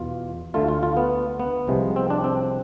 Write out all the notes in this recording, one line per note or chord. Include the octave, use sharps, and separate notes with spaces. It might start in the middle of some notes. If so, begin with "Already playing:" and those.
Already playing: E2 B2 F4
D2 D3 A3 F4
F4
F4
B3
B3
C2 C3 F3 G#3
C4
D4
C4